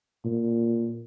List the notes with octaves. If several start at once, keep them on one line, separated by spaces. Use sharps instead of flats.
A#2